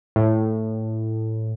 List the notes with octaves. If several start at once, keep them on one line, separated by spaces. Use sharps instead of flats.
A2